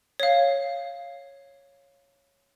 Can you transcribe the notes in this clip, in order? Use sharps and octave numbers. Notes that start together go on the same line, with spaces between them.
C#5 F5